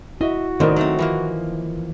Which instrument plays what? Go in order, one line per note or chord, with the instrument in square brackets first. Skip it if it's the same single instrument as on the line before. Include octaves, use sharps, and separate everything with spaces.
[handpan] E4 [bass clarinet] F#4 [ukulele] D#5 E5
[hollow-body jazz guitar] C2 A2 D3 [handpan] D#3 D#5 [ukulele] D#4 A#4 C5
[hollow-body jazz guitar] F#3 A3 C4
[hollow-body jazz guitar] E3 F3 A#3 [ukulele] E5